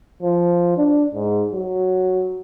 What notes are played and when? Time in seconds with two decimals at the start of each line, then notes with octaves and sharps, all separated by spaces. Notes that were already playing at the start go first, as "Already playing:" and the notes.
0.22 F3
0.77 D4
1.14 G#2
1.53 F#3